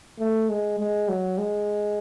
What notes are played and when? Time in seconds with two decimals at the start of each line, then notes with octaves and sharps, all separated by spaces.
0.19 A3
0.49 G#3
0.79 G#3
1.08 F#3
1.38 G#3